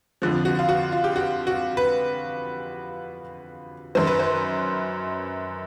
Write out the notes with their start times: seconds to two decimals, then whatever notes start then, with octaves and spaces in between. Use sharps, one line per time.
0.22 F2 D3 F3
0.45 F#4
0.59 F4
0.69 F#4
0.92 F4
1.04 G4
1.16 F#4
1.47 F#4
1.77 B4
3.95 F#2 D#3 F#3 C5
4.07 B4
4.19 C5